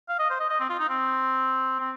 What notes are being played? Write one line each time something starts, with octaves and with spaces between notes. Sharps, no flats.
F5
D#5
C5
D#5
D#5
C4
F4
D#4
C4
C4